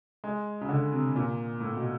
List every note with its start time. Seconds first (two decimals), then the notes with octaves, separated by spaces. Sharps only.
0.24 G#3
0.61 C#3
0.69 D3
0.92 C3
1.16 A#2
1.60 A2
1.76 B2